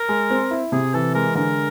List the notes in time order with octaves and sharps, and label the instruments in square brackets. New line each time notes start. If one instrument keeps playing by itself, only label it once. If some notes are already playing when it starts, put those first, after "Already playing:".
Already playing: [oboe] A#4
[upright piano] G#3
C4
E4
[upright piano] C3 [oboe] G#4
[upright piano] E3 [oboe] A4
[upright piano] G#3 [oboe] A#4
[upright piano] D3 [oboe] A#4